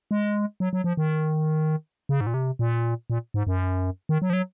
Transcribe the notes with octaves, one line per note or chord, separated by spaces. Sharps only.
G#3
F#3
F#3
F3
D#3
C#3
G#2
A#2
C3
A#2
A#2
G#2
F#2
D#3
F#3
F3
F#3